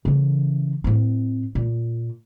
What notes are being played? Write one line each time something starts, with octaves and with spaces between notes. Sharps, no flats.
C#3 E3
A2 C4
A#2